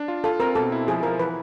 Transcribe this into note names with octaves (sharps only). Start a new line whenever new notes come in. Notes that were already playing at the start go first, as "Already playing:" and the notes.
Already playing: D4
F4
F4 A4
C4 A#4
B2 A4
E4
F3 G#4
F3 A#4
E3 B4